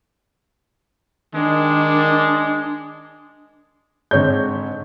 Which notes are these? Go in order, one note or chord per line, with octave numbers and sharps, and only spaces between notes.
D#3 G#3 D4
G#2 D3 C4 C#5 G6